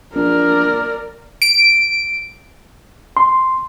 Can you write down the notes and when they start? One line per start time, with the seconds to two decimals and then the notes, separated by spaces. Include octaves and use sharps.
0.15 A#1 A#4 D5
1.42 D7
3.17 C6